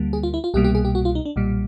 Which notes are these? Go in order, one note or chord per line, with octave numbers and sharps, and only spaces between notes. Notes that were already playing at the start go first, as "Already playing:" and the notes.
Already playing: D2 D3 G3 A#3
G#4
F4
E4
F4
C2 B2 G3 A#3 G4
G4
G#4
G4
F#4
F4
D#4
D4
B1 A#2 G3